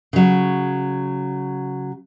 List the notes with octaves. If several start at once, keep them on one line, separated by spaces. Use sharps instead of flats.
C#3 F#3